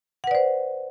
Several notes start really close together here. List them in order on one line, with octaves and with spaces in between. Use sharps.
F#5 B4 D5 C5